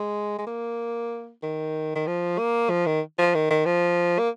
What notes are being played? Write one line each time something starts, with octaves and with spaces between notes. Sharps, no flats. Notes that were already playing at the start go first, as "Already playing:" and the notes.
Already playing: G#3
G#3
A#3
D#3
D#3
F3
A#3
F3
D#3
F3
D#3
D#3
F3
A#3